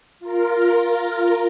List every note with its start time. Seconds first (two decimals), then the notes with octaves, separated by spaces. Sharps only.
0.20 F4 A#4